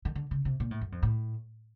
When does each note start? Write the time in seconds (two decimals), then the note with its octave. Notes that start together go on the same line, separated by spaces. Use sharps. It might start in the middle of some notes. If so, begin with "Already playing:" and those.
0.05 D#3
0.15 D3
0.31 C#3
0.45 C3
0.60 A#2
0.71 A2
0.81 F#2
0.92 F2
1.03 A2